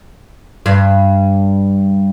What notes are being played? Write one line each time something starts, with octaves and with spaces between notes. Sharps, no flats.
G2